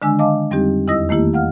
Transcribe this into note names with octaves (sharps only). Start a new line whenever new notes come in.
D3 D#3 G#3 D4 G#5 E6
D#5 F5 A5 D6
F2 G3 C4 D#4 G4
E2 E4 D#5 D#6 E6 A#6
D#3 A3 A#3 E4 G4
F5 F#5 F6